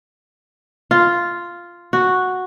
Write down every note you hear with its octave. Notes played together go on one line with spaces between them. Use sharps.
F4
F#4